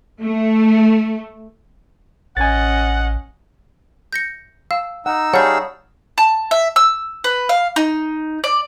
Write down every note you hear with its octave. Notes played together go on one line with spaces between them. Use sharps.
A3
A1 C#4 D#5 F#5 G#5 A6
G6 A#6 C#7
F5 E6
D#4 F#5 E6
G3 G#4 C#5 F5 F#5 A5 C#6 G6
A5
E5
E6
B4
F5
D#4
D5